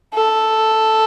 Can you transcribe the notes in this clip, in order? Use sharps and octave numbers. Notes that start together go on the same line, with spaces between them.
A4